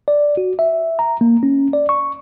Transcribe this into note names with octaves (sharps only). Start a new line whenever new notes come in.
D5
F#4
E5
A#5
A#3
C#4
D5
C#6